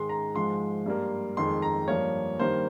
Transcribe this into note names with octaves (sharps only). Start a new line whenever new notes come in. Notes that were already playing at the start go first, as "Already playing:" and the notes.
Already playing: G#2 D#3 G#3 C6
A#5
G#2 F3 G#3 C6
G2 G3 A#3
F2 D#3 G#3 C6
A#5
G2 F3 A#3 C#5
G2 D#3 G3 A#3 C5